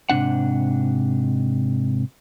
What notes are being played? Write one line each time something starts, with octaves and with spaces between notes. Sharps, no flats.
G#2 C3 D4 F#5